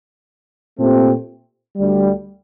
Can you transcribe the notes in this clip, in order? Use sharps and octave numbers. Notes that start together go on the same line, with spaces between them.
A#2 A3 C4 G4
D2 D3 G3